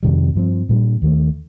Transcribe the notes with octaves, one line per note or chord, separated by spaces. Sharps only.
F2 C3 D#3 G3
G2 F3 C4
A#2 G3 D4
D#2 D#3 A3